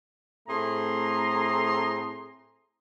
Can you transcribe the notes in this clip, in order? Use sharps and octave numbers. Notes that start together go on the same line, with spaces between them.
A2 A3 C4 G#4 A#5 C6